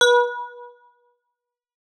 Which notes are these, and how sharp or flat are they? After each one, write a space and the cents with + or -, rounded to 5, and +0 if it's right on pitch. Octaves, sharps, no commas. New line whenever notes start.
B4 -35